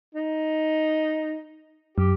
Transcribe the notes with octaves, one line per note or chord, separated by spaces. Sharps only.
D#4
F#2 G4